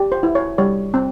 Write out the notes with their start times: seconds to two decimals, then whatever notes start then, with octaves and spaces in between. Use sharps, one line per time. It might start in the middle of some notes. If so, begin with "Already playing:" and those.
Already playing: G4
0.12 C5
0.23 E4
0.35 C#5
0.58 G3 C#5
0.94 C4